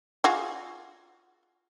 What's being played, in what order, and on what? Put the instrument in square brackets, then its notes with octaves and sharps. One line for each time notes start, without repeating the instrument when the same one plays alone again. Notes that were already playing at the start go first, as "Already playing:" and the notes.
[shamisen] F4 F#4 G#4